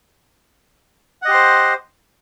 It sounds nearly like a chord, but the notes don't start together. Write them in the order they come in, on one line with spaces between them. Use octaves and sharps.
F#5 D#5 G4 C6 C5